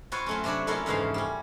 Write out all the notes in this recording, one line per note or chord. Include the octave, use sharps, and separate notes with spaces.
C4 F4 F#4 B4 C#5
F#3 A3 C#4
C3 F#3 D4 C#5 B5
A3 A#3 C#4 E4 F4 A#4
F2 G#2 C#3 E3 F#4 F5
G3 C#4